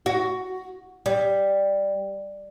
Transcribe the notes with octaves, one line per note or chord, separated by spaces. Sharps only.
F#4
G3